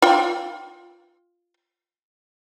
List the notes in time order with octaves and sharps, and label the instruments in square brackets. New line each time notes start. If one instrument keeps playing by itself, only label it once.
[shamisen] F4 G5